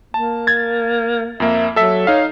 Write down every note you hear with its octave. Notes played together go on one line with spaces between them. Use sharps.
A#3 A5
G#6 A6
F2 A#3 E5
F#3 A4 E5
D#4 C#5 F5